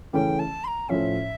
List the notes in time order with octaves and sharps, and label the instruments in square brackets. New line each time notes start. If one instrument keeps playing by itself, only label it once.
[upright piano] C#3 E3 A3 C#4 [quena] G5
[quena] A5
C6
A#5
[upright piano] A2 F3 C#4 [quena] E5